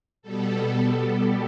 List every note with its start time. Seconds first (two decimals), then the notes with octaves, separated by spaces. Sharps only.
0.22 B2 G3 B3 A4
1.11 G4